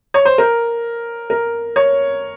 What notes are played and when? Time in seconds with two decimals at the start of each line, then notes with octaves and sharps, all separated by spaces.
0.14 C#5
0.25 C5
0.38 A#4
1.30 A#4
1.76 C#5